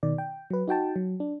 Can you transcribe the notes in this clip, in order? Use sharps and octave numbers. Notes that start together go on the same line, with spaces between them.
B2 D#3 D5
G5
F#3 B4
D#4 F#4 G5 A5
F#3
D4